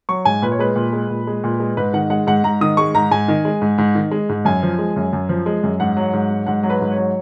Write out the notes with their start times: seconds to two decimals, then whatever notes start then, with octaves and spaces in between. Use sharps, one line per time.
0.09 F#3 C#6
0.25 G#2 G#5
0.42 A#2 B4
0.52 C#5
0.59 G#3 B4
0.76 A#2
0.93 G#3
1.10 A#2
1.27 G#3
1.44 A#2
1.60 G#3
1.77 G#2 B4
1.94 D#3 F#5
2.10 G#3 F#5
2.27 G#2 F#5
2.44 G#2 A#5
2.61 D#3 D#6
2.77 G#3 C#6
2.95 G#2 A#5
3.11 G#2 G#5
3.28 D#3
3.45 G#3
3.62 G#2
3.78 G#2
3.95 D#3
4.11 G#3
4.29 G#2
4.45 F#2 G#5
4.63 F3
4.79 G#3
4.96 F#2
5.13 F#2
5.29 F3
5.46 G#3
5.64 F#2
5.80 G#2 F#5
5.97 F#3
6.13 G#2
6.30 F#3
6.46 G#2 F#5
6.63 F#3
6.70 B4
6.81 G#2
6.92 C#5
6.97 F#3